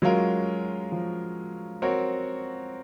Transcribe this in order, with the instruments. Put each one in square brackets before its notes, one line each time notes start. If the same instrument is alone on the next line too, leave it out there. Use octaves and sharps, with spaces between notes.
[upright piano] F#3 [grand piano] G#3 C#4 F4 A#4
[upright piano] F3
[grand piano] C4 F#4 A#4 C#5